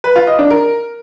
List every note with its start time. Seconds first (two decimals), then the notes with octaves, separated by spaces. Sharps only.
0.04 B4
0.16 F4
0.27 D#5
0.39 D4
0.50 A#4